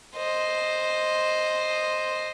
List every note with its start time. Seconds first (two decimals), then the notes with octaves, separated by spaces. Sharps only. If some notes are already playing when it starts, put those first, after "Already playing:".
0.16 C5 D#5